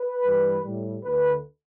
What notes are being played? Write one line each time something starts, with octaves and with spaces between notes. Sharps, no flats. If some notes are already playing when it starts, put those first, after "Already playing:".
Already playing: B4
G2 E3 G3
A2 G3
D2 D3 A3 B4